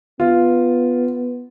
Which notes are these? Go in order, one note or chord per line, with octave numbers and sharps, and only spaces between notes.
B3 F4